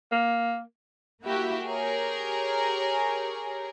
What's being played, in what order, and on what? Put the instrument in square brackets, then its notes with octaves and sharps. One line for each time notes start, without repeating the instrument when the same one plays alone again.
[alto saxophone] A#3
[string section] A#3 E4 F#4 G4 E5
G4 G#4 A#4 C#5